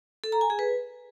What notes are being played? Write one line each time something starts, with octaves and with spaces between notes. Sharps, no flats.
A4
A#5
G#5
G#4
B4